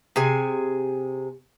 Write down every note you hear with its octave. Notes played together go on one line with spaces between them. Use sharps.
C3 G#4 G#5